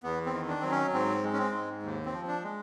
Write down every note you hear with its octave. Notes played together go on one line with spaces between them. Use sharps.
E2 B3
C4
D#3
D4
F#3 C4
C#4
G#2 C4
G#3
C#4
C4
G#2
D#2
C4
F3
D4
G#3